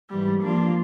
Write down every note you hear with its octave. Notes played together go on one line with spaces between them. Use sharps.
G#2 E3 G3
F3 A#3 D4 F4